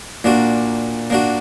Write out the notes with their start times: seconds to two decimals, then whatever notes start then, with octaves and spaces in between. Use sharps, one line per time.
0.24 A#2 A#3 D4 F#4
1.10 A#3 D4 F#4